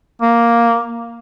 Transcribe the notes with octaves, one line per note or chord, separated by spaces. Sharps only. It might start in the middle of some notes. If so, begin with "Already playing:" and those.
A#3